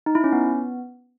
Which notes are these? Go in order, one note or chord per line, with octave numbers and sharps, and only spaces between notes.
D#4
E4
C#4
B3